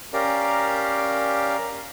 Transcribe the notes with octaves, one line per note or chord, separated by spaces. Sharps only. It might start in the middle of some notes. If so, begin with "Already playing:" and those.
C#4 G4 A#4 D5 F5 A#5